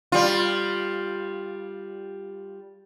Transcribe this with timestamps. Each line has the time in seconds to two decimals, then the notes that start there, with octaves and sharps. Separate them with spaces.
0.12 G3 F4